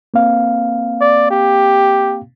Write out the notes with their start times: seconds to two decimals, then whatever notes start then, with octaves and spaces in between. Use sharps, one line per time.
0.14 A#3 C4 F5
1.01 D5
1.31 G4